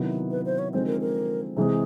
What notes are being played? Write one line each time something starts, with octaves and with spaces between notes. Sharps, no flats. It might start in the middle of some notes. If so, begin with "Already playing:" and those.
Already playing: C3 D#3 F#3 B3 E4
B4
C5
C#5
D3 F3 G#3 C4 D#4 C5
A#4
A#4
C3 E3 G#3 C4 G#4